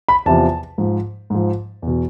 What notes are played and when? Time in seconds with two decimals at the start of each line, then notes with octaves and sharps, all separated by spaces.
0.09 B5
0.26 E2 C3 F3 A5
0.78 G#2 F3
1.30 G#2 F3
1.82 E2 B2